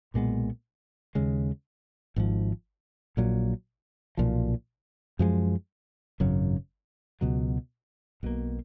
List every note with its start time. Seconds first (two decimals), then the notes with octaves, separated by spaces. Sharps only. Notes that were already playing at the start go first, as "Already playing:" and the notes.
0.14 B1 A#2 G#3 B3
1.15 D#2 C#3 G#3
2.16 G#1 G#2 F3
3.17 A#1 A#2 F#3
4.17 B1 A#2 F3
5.19 F#2 F3 G#3
6.20 G#1 F#2 C#3 F#3
7.21 C#2 B2 F#3
8.23 B1 B2 A#3